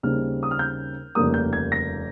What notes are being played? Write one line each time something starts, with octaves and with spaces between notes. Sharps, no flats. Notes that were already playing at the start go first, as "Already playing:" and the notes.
D#2 C#3 G3 C4 D#4 F6
D#6
F6
G6
F1 D#2 C#3 G3 A#3 D#6
G6
G#6
A#6